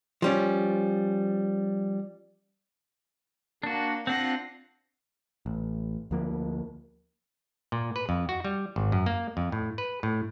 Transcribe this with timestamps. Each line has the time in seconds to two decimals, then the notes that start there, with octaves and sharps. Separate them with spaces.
0.22 F3 G3 C#4
3.63 A#3 D4 F#4
4.07 C4 D4 F4 F#5 A#6
5.46 A1
6.11 D2 F3 A#3
7.72 A#2
7.96 B4
8.09 F2
8.29 F#4
8.45 G3
8.76 G#1
8.92 F#2
9.06 A#3
9.37 F2
9.52 A2
9.78 B4
10.03 A2